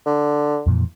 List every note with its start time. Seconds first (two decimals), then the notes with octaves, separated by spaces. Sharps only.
0.06 D3
0.67 F2 A#2 E3